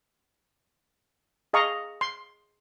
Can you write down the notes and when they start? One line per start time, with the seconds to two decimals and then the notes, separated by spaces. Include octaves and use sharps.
1.53 G#4 D#5 F5 A#5 C#6
2.01 C6